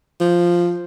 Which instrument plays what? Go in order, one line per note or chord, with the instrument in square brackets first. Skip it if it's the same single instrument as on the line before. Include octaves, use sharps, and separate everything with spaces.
[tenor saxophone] F3